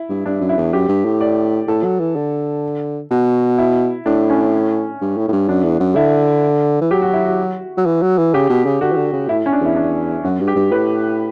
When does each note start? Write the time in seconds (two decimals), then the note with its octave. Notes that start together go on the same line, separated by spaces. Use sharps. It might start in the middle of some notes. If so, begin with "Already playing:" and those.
Already playing: E4
0.09 G2
0.26 G2 D4
0.41 F#2
0.49 E4
0.57 E2
0.73 F#2 G4
0.89 G2
1.05 A2
1.21 D5
1.68 A2 A4
1.84 F#3
2.00 E3
2.16 D3
3.11 B2 F#4
3.58 E4
4.06 A2 D4
4.30 C#4
5.01 G2
5.17 A2
5.29 A2
5.32 G2
5.48 F#2 D4
5.64 E2
5.80 F#2
5.96 D3 E4
6.81 E3
6.91 F#3 G4
7.02 F#4
7.13 E4
7.25 F#4
7.78 F#3
7.86 E3
8.02 F#3
8.18 E3
8.34 C#3 G4
8.49 B2
8.66 C#3
8.81 D3 F#4
8.92 E3
8.97 D3
9.13 C#3
9.28 A2 E4
9.46 C#4
9.53 D4
9.61 E2 E4
9.76 D4
10.24 F#2 F#4
10.40 G2
10.48 G4
10.56 G2
10.72 A2 B4